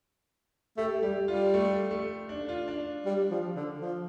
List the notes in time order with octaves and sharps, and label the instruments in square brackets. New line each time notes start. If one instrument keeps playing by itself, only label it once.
[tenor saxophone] A3 [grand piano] G4
[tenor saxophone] G3 [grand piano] G4
[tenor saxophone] G3 [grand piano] F4
[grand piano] A3
A3
D4
F4
D4
[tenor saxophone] G3
F3
D3
F3